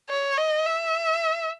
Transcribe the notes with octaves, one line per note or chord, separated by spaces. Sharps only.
C#5
D#5
E5